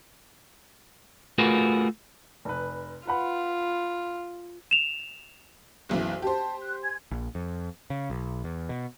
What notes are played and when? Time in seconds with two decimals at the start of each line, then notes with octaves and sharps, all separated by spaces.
1.38 A3 F4 F#4 G#4 A#4 B4
2.45 F1 B4
3.07 F4 B4 F#5 B5
4.71 E7 F7
5.89 F#1 B1 E3
6.22 G4 C5 A5
6.61 F#6
6.82 G#5 C6 G#6
7.11 A#1
7.35 F2
7.90 C#3
8.10 B1
8.44 E2
8.69 B2